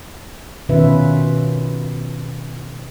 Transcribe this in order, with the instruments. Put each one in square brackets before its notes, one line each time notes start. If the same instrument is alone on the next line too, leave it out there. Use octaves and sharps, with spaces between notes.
[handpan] B2 D#3 C#4 F4 B4 E5